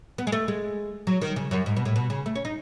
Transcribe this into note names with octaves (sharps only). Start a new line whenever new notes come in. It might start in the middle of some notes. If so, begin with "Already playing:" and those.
B3
G#3
A3
G#3
F#3
D#3
C#3
F#2
G#2
B2
A2
B2
C#3
A3
C#4
D#4